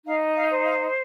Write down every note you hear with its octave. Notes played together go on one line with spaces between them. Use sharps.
D#4 F5
F5
C5
F5